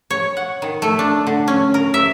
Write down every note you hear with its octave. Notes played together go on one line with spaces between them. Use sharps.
C#5
F#5
D#3
A3
D4
D3
C#4
A#4
E5